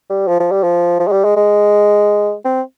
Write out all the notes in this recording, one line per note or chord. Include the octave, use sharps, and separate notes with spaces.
G3
F3
F3
G3
F3
F3
G#3
G3
G#3
G#3
C4